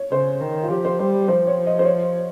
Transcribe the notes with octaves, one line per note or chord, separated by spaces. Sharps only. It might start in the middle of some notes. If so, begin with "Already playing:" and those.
Already playing: C#5
C#3 C5
D#3
F4
F3 G4
C5
G3 C5
F3 C5
C#5
D#5
C5
C#5